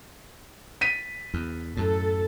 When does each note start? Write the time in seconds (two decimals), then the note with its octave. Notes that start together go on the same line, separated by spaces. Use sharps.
0.81 B6 D#7
1.34 E2
1.77 F#2 A2 A4